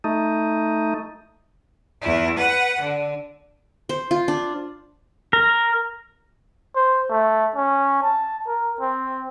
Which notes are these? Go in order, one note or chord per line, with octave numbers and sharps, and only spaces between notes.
A3 D#4
E2 E4
B4 F#5
D3
C5
F4
D4
A#4
C5
A3
C#4
A5
A#4
C4